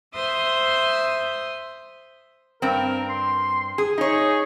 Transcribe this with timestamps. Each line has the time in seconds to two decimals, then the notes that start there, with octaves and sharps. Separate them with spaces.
0.14 C5 E5 C6 D#6
2.62 G2 C4 A#4
3.09 C6
3.78 G#4
3.98 D#4 G#4 C#5